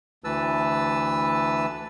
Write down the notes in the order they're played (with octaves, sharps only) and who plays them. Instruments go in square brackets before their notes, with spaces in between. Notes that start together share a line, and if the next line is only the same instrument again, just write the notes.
[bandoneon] D2 E3 B4 A5 E6